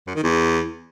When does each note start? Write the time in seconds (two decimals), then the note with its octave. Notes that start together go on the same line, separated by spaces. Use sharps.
0.08 F#2
0.15 D#3
0.23 E2